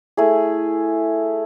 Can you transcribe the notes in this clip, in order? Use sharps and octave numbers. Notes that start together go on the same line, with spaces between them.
A3 E4 G#4